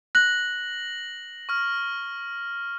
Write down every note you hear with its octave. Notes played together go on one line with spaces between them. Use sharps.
F#6 A#6 F#7
C#6 F6